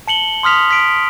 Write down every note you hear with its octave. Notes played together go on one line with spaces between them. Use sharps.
A5 C#7 F#7 G7
C6 D#6 F6 B6 F7
B6 D7